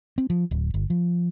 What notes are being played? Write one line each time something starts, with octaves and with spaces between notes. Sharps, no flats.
C4
F3
D1
G1
F3